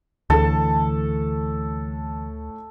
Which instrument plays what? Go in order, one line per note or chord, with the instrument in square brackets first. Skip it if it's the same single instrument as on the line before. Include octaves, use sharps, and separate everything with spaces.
[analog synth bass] D2 [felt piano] A2 A3 [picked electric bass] D3 E3 D4 [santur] A4 A5